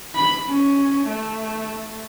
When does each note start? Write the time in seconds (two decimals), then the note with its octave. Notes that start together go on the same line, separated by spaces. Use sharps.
0.15 B5
0.49 C#4
1.08 A3